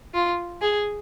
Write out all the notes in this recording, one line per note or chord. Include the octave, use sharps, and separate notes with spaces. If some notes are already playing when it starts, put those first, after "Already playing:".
F4
G#4